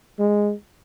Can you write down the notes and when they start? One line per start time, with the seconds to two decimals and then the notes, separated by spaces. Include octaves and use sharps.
0.19 G#3